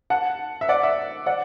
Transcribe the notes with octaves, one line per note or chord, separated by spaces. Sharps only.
F#5 A5
E5
D5 F#5
E5
D5 F#5